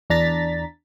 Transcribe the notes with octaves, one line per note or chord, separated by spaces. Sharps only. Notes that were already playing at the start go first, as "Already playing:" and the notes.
E2 D4 A#5 A6 B6